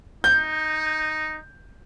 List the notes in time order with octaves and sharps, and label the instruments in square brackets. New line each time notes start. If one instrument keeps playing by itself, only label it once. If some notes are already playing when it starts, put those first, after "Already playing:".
[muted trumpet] D#4 [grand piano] G6